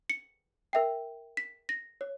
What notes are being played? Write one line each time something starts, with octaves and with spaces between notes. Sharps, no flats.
C#7
A#4 E5 G5
B6
A#6
C#5